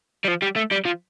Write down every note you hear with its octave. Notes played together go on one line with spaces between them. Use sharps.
G3
F3
G3
A3
G3
F3